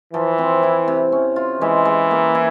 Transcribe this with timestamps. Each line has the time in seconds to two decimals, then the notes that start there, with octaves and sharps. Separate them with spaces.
0.13 E3 F3
0.38 C4
0.63 E4
0.88 C3
1.12 C#4
1.36 F4
1.61 E3 G#3
1.85 G#3
2.11 A#3
2.35 E4